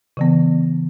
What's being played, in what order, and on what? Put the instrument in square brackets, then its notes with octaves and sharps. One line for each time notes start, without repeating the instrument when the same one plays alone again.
[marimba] C#3 E3 B3